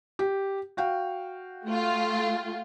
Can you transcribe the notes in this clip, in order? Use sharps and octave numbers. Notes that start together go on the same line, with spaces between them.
G4
F#4 F5 G5
A3 F4